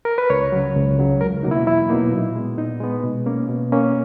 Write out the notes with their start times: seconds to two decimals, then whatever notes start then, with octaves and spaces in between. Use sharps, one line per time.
0.05 A#4
0.18 B4
0.30 C#2 C#5
0.52 C#3 F#3
0.76 C#2
0.99 C#3 F#3
1.21 E2 A#4
1.43 B2 F#3 A#3 D#4
1.51 E4
1.66 E2 E4
1.89 B2 F#3 A#3 D#4
2.12 A#2
2.35 G#3 B3
2.57 A#2 D#4
2.80 G#3 B3
3.03 B2
3.26 A#3 C#4
3.49 B2
3.72 A#3 C#4